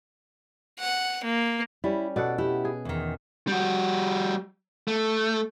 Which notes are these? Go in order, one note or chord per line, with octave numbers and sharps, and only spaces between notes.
F#5
A#3
G3 C#4 E4
B2 A4 D5 F#5
E4 G4
G#4
E2 D#3
G3 F#4
A3